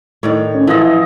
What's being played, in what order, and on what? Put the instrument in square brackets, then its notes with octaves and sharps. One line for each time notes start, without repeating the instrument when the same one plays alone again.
[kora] A2 D#3 D5 [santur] C#5
[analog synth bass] C#4
[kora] E3 B3 [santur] F3 D#5 [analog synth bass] E4